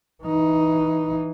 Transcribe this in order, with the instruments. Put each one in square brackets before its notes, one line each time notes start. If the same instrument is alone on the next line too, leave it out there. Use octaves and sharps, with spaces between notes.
[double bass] E3 D#4